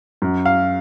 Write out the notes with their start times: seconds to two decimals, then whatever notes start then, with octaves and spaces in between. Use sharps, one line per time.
0.22 F#2
0.46 F5